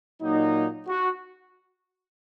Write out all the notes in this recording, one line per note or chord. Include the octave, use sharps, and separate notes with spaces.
A#2 F#3 A#3 D#4
F#4